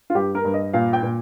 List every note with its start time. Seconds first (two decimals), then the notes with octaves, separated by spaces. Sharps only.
0.10 F4
0.15 G2 G4
0.35 A#4
0.45 G2
0.54 D#5
0.73 A#2 F5
0.93 G5
1.03 A#2